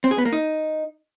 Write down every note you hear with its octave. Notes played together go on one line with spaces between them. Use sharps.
C4
G#4
B3
A#3
D#4